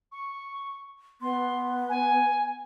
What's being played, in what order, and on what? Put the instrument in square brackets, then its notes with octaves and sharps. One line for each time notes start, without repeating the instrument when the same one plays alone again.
[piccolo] C#6
[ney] B3 [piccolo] C6
[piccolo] G#5